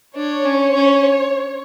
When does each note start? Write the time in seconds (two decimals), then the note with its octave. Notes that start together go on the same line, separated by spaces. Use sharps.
0.16 D4 C#5
0.45 C#4
0.75 C#4